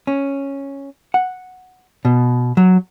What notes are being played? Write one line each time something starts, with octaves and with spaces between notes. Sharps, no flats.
C#4
F#5
B2
F#3